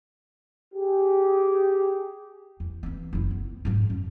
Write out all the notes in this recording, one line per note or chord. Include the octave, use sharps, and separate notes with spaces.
G4 G#4
E2
E3 C4
F#1 E4
B3
G#2 F3
F#2